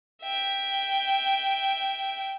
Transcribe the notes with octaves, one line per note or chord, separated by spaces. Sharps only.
E5 G5